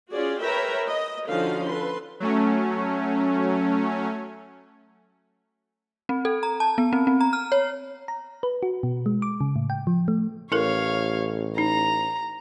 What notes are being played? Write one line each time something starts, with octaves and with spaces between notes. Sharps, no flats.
C#4 F4 F#4 G#4 D5
A#4 B4 C#5 E5 G5 A#5
D#5
D3 F3 C#4 D#4 F#4 F5
A4 B4 C6
F#3 A3 C#4
C4
A4
A#5
A5
B3
C4
C4
A#5
F6
C#5
A#5
B4
F#4
B2
G#3
D6
C#3
A2
G5
F3
A3
A1 E4 A4 A#4 C#5 F5
D#4 A#5